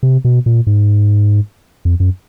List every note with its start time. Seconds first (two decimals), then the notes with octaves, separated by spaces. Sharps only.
0.03 C3
0.25 B2
0.46 A#2
0.67 G#2
1.85 F2
2.00 F#2